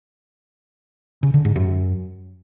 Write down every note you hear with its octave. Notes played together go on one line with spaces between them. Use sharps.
C#3
D3
G#2
F#2